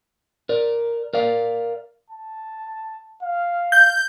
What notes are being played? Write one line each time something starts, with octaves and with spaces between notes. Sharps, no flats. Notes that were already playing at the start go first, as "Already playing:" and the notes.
A#4 D5
A#4 D5 F5
A5
F5
G6